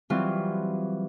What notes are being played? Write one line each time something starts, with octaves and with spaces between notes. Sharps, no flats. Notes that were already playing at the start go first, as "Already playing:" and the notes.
E3 F#3 G3 C4 F4